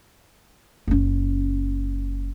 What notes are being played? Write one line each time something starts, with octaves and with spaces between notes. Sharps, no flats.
F#1 C#4